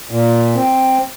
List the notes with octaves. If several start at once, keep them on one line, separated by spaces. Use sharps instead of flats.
A#2
C4